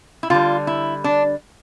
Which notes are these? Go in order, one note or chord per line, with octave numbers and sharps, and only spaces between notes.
E4
D3 G3 F4
E4
D4